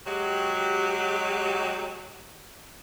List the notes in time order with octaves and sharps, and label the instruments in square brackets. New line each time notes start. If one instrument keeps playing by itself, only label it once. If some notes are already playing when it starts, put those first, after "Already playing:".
[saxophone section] F#3 G#3 F#4 G4